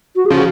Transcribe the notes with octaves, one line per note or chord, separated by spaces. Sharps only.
F#4
G#4
C#3 F3 F#4